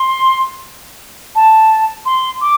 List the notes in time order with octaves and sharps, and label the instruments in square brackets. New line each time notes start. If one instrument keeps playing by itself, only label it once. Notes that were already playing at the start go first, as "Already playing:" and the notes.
Already playing: [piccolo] C6
A5
C6
D6